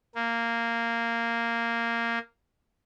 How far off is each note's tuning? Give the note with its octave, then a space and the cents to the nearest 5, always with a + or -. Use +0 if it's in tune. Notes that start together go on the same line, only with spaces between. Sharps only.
A#3 -10